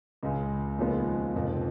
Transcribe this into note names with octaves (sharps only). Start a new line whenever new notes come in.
C#2 C#3 G#3
D#2 C#3 F3 G#3 B3
F1 F2 C#3 F3